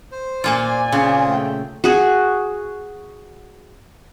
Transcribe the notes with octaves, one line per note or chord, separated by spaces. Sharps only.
C5
A#2 A#3 F4 D5 G#5
C#3 C4 F4 G#4
A3 G5
F#4 G#4